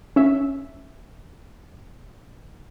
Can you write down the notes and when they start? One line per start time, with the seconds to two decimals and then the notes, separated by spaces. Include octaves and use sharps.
0.16 C#4 E5